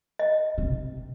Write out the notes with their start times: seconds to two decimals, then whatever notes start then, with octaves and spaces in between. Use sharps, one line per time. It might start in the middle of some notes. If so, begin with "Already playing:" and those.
0.19 D#5
0.58 C3